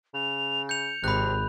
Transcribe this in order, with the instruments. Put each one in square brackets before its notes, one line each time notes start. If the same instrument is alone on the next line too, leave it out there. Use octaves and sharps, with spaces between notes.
[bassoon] C#3 [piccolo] F7
[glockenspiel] G6 F7 [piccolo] C#7
[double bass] G#1 [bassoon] C3 [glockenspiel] B5 F#6